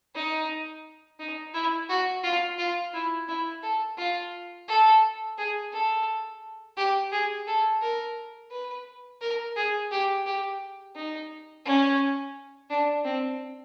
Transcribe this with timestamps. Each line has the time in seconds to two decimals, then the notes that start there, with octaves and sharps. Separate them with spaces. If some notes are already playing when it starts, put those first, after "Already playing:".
0.15 D#4
1.19 D#4
1.54 E4
1.89 F#4
2.24 F4
2.58 F4
2.94 E4
3.28 E4
3.63 A4
3.98 F4
4.68 A4
5.38 G#4
5.72 A4
6.77 G4
7.12 G#4
7.47 A4
7.82 A#4
8.51 B4
9.21 A#4
9.56 G#4
9.92 G4
10.26 G4
10.96 D#4
11.65 C#4
12.70 D4
13.05 C4